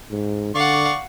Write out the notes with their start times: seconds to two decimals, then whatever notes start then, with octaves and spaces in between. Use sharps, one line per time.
0.11 G#2
0.55 D3 D5 F5 F#5 C#6